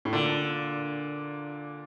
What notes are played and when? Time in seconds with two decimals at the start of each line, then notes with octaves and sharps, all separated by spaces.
0.05 A2
0.13 A#2 D3